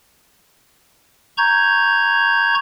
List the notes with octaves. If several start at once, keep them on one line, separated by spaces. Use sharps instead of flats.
A#5 C#6 G6 G#6